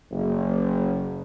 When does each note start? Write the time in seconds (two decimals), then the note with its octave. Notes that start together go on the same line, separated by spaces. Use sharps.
0.11 F#1